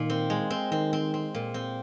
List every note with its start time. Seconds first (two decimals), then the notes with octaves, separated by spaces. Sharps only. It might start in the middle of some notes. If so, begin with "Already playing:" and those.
Already playing: A#2 D#3
0.10 C4
0.30 G#3
0.50 C4
0.71 D#3 C4
0.93 C4
1.14 C4
1.34 A#2
1.54 C4